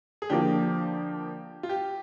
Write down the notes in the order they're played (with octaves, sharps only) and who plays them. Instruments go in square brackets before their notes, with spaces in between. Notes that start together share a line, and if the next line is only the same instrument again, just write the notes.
[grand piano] G#4
[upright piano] D3 F3 A#3 [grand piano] G4
[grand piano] F4
G4